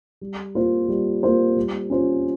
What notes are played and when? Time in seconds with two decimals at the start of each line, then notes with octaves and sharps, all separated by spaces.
0.21 G3
0.55 A#3 F4 C5
0.89 G3
1.23 A#3 F4 C5
1.57 G3
1.90 C#4 F4 C5